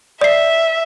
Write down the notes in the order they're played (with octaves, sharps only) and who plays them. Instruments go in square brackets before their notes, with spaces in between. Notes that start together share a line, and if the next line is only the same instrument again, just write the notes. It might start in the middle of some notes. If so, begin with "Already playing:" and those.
[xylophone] D5 C7 [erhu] E5